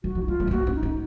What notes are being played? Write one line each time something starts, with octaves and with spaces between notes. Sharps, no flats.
F3 F#4
F3
D#4
F3 F4
G#3
B3
A#3 F#4
C#4
D#4
C#4